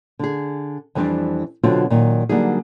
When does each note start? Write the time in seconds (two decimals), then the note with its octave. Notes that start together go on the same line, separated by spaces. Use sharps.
0.19 D3 G#4
0.95 F2 E3 G3 B3 C4 D4
1.63 B2 D3 F#3 C4 F4 F#4
1.90 A#2 D#3 F#3
2.29 D3 F#3 G3 A#3 D#4 G#4